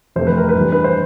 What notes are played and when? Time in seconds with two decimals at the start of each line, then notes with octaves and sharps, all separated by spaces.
0.16 F2 C3 E3 A3 C5
0.27 B4
0.37 A#4
0.49 B4
0.55 G2 E3 G3
0.72 B4
0.84 C5